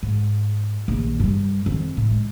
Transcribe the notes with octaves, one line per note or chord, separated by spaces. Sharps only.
G#2
A#1 D#2
G2 G3
F2 D#3
A2
G#3